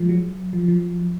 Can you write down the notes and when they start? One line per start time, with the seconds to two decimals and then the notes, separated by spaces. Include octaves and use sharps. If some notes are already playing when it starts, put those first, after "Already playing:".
Already playing: F3 G#3
0.09 F#3
0.53 F3
0.68 F3